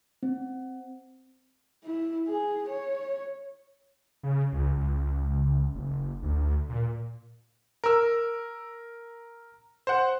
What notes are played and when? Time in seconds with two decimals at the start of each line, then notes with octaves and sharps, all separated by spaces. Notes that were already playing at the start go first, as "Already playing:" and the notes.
0.23 C4
1.84 E4
2.27 G#4
2.69 C#5
4.23 C#3
4.53 C#2
4.76 C#2
5.75 F#1
6.23 D2
6.70 A#2
7.84 A#4 E6
9.87 C5 F#5